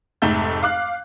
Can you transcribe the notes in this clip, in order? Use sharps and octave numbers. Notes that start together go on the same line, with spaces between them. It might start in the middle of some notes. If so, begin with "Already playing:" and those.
F1 G#2 A3 A4 E5 G6
F5 D6 F#6